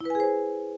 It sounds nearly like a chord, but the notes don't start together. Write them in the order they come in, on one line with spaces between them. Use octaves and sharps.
E4 B4 G#5 G#4 C5